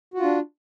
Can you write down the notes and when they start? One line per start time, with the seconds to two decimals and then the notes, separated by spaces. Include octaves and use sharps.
0.14 F#4
0.18 F4
0.23 D4